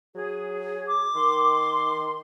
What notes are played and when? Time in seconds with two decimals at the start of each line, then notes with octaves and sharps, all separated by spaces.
0.16 F#3 G#4
0.88 D6
1.16 D#3 C6